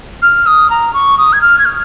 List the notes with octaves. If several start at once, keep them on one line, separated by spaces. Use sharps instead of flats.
F6
D#6
A#5
C#6
D#6
G#6
F6
G#6
F6